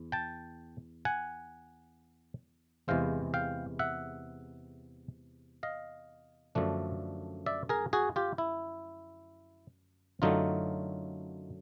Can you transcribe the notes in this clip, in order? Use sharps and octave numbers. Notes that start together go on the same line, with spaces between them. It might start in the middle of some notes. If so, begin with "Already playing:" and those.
Already playing: E2
G5 A5
F#5 G#5
E2 C3 E3 G#3 C4 F5 G5
F5 G5
E5 F#5
D#5 F5
F#2 D3 F3 A3 D4
D5 E5
G#4 A#4
F#4 G#4
F4 G4
E4
F#2 D3 F#3 A3 D#4 F4